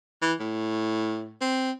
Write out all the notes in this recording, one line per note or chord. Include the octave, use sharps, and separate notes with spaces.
E3
A2
C4